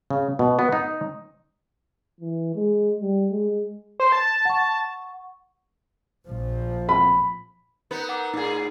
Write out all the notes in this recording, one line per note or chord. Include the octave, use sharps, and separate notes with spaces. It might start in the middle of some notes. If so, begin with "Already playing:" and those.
C#3
B2
B3
D#4
E3
G#3
G3
G#3
C5
A5
F#5 C#6
A#1 F3
B5
B3 D#4 A#4 B4
A#4 F#5 D6
A2 D#4 G#4